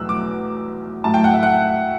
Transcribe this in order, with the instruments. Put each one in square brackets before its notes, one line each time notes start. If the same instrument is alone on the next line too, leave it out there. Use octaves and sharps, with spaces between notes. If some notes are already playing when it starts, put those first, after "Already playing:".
Already playing: [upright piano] E2 B2 F#3 A3 E6 F#6
D6
A2 F#3 A3 A5
G5
F#5
E5
F#5